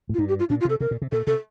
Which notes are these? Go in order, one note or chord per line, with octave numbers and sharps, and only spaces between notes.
A2
F4
G2 D#4
G4
F4
A#2 D4
F4
C3 A4
C3 A#4
A#2
C3
A#2 A4
C3 A4